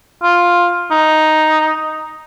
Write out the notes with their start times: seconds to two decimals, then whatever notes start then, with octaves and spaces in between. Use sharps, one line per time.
0.23 F4
0.91 D#4